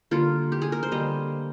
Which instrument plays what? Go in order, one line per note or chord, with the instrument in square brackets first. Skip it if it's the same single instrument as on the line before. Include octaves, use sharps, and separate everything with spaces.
[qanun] D3 G3 A#3 F4
G4
G#4
A#4
C5
D3 G3 A#3 D#5